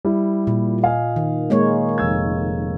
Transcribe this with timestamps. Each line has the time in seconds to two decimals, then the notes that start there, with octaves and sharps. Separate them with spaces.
0.05 G3 E4 G4
0.47 A#2
0.83 D#5 F5 G#5
1.16 D#3
1.50 G#3 A#3 C#5
1.98 F1 E6 G#6